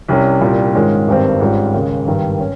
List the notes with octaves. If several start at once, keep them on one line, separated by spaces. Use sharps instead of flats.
C2 C3 G3 C#4
C2 A#2 G3
G#2 D#3 G#3 C#4 F4
G#1 G2 D#3 G3 C4
G#2 G3 C#4 F4
D#2 C#3 G#3
G#1 G2 D#3 G3
C#4